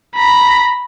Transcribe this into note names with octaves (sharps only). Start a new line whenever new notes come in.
A#5 B5